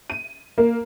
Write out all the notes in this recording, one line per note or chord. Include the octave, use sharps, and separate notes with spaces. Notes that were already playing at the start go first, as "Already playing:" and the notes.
D#7
A#3